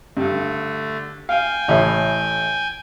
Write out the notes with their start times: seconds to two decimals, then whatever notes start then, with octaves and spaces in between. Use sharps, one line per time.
0.17 G2 D3 A3
1.29 F5 G5 G#5
1.68 A1 A2 E4